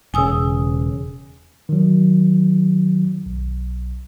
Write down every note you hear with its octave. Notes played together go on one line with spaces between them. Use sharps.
E1 C#3 G#5 D#6 E6
D#3 F#3
B1